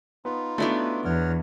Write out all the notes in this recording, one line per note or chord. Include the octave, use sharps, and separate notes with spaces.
B3 D#4 F4
A3 B3 D4 E4 F#4
E2 C#5 F#5 F6